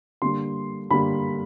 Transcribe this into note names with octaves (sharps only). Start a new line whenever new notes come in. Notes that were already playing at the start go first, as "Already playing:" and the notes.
D3 G3 A#3 C6
D3 G3 A#3 B5